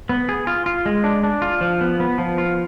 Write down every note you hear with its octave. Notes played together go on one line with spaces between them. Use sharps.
B3
G#4
F4
F4
G#3
D4
D4
F4
F3
B3
B3
F3
F4